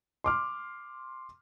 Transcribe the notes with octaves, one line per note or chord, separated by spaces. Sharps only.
C6 D6 F6